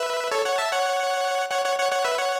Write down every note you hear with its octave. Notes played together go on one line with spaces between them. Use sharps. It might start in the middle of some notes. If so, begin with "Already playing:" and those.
Already playing: B4 E5
A4 C#5
C#5 F#5
E5 A5
C#5 F#5
C#5 F#5
C#5 F#5
C#5 F#5
C#5 F#5
B4 E5
C#5 F#5